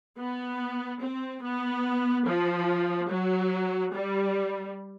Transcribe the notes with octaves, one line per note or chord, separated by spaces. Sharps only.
B3
C4
B3
F3
F#3
G3